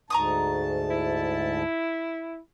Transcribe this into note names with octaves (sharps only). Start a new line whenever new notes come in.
D2 G#2 A5 A#5 C#6 D#6
E4